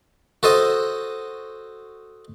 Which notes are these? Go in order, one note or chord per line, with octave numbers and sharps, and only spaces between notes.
F#4 A4 C5 D#5